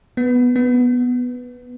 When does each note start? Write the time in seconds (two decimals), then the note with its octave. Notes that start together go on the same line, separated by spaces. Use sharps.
0.17 B3
0.56 B3